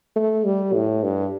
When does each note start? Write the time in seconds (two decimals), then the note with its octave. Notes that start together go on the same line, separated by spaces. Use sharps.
0.16 A3
0.45 G3
0.74 A2
1.03 G2